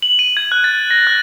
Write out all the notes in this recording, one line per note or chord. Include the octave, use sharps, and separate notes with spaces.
F#7
D#7
G#6
F#6
A6
A#6
F#6